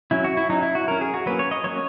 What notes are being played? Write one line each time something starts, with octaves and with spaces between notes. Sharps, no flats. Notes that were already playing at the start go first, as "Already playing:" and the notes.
F#3 C#4 E4
F#4
E4
F#3 C#4 D#4
E4
F#4
F#3 C#4 A#4
G#4
F#4
F#3 A#3 C#4 B4
C#5
D#5
F#3 A#3 C#4 C#5